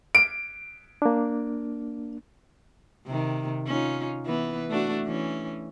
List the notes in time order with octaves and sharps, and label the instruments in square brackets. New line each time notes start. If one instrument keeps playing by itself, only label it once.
[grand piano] D7
[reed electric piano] A#3 D4
[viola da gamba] C3 D#3
C#4 D#4 F4
E3 B3 B4
A3 D4 F#4
E3 C#4